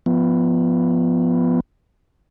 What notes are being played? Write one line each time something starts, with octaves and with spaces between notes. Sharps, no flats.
F3 B3